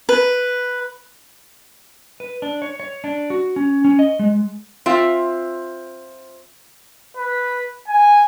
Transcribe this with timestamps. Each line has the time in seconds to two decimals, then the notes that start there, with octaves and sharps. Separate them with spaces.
0.09 B4
2.20 B4
2.42 D4
2.62 C#5
2.80 C#5
3.04 D4
3.30 F#4
3.56 C#4
3.85 C#4
3.99 D#5
4.19 G#3
4.86 C4 F4 E5
7.17 B4
7.88 G#5